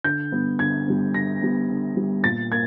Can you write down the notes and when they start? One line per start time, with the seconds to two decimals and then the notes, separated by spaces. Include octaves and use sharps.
0.04 D3 G6
0.32 G3 B3
0.59 D3 G#6
0.88 G3 B3
1.14 D3 A#6
1.42 G3 B3
1.70 D3
1.97 G3 B3
2.24 A#2 A6
2.52 A#3 G#6